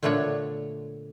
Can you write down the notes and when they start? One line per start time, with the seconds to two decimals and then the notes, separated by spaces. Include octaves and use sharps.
0.03 A#2 D3 A3 B3 D4 C#5